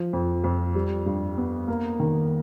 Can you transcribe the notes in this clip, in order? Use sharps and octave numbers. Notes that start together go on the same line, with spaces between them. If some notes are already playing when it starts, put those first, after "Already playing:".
Already playing: F3
F2
F2
G3
G2
B3
A#3
D#3